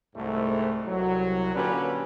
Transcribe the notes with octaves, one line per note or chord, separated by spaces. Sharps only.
C2 G#2 A3
C2 F#3
A#2 D3 C#4 D4 G4 B4